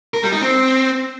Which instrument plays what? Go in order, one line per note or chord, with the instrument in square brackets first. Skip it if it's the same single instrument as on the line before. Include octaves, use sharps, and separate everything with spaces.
[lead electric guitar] A#4
G3
D#4
C4